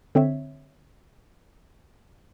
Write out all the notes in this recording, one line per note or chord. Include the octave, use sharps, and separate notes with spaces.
D3 C4 C#5 E5